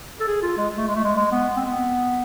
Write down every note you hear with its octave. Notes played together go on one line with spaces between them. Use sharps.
A4
G#4
F4
G#3
A3
G#3
A3
G#3
G#3
B3
C4
B3